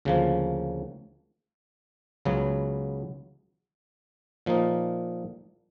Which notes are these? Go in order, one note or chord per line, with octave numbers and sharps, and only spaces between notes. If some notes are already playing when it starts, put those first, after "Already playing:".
D2 C#3 F3 A#3
C#2 C#3 F#3 B3
A#2 F3 A#3 D#4